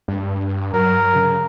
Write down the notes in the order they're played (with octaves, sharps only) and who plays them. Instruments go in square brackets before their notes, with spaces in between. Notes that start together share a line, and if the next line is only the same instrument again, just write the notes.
[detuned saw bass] G2
[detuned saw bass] F#3 [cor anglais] A#4
[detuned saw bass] C#3